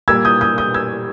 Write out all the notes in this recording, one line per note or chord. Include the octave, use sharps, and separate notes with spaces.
A#2 G3 A#3 E6 G#6
D#6 G6
D#6 G6
D#6 G6
E6 G#6